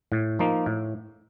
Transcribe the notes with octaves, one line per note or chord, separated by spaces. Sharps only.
A2
F3 A#3 D#4
A2